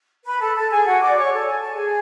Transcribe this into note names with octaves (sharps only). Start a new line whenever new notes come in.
B4 B5
A4 A5
A4 A5
G#4 G#5
F#4 F#5
D5 D6
C#5 C#6
A4 A5
G#5
A5
G#4 G#5